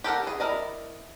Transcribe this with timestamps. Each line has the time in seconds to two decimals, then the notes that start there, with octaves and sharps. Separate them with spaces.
0.04 G4 A4 A#4 F#5
0.23 E3 G#4
0.40 E4 A#4 D5 D#5